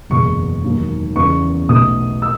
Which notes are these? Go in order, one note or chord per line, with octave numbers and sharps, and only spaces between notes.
F#1 E2 B2 G#3 C#6
E1 D#2 D#3 F#3
E2 C#3 E3 B3 C#6
B1 B2 A3 D#6
E6